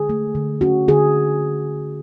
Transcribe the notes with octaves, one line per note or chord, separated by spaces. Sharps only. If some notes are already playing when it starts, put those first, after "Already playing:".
Already playing: D3 G#4
A3
D3
C#4 F#4
D3 G#4